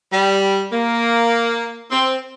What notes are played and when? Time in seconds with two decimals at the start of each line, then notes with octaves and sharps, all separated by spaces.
0.13 G3
0.73 A#3
1.91 C4